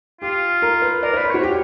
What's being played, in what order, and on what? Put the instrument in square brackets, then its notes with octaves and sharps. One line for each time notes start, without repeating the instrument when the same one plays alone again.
[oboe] F4 [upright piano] G4
[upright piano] A#4
B4
[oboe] A#4 [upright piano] D5
[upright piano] C5
[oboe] B4
[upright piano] C5
[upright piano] F#4 [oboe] C#5
[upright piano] G4